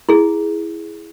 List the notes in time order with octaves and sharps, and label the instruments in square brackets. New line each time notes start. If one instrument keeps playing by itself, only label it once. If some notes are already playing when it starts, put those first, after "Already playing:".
[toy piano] E4 G#4